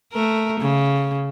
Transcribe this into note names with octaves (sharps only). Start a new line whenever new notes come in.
A3 A#4
C#3